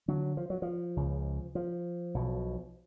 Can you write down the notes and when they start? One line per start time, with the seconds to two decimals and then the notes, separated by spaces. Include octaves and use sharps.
0.08 D3 F#3
0.37 F3
0.50 F#3
0.62 F3
0.97 C#2 C#3
1.55 F3
2.14 B1 B2